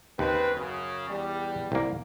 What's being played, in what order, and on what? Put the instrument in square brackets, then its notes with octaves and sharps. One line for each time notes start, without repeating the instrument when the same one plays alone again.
[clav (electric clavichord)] D#2 [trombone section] C#3 C4 B4
[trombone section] F#2 C#3
E2 G3
[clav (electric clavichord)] C2 A#3